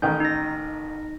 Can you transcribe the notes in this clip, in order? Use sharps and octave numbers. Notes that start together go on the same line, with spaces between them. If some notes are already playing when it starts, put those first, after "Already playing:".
A1 D#3 G6
D#4 A#6